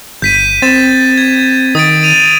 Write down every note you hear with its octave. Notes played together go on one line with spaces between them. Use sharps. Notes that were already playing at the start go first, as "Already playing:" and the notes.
G1 G6 B6 D#7
C4 A6 E7
G#6
D#3 D#6 A6 D7
D#7 F7